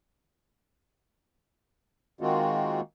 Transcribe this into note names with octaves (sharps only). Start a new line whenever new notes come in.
D#3 G#3 A#3 C4 F4 F#4